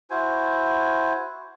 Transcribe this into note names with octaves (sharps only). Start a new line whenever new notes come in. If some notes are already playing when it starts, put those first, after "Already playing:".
E4 F#4 C5 G#5